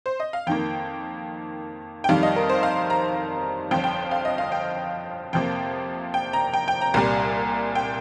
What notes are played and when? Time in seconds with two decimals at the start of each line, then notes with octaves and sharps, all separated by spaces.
0.06 C5
0.20 D#5
0.33 F5
0.47 F2 D#3 A#3 G5
2.04 G5
2.09 F2 D#3 G3 F5
2.23 D#5
2.36 A#4
2.49 C5
2.63 F5
2.90 A#5
3.71 G1 F2 F3 G5
3.84 G5
4.11 F5
4.25 D#5
4.38 F5
4.52 G5
5.33 F2 C3 F3 A#3 G5
6.14 G5
6.33 A#5
6.54 G5
6.68 G5
6.81 A#5
6.94 C2 A#2 G3 A#5
7.75 G5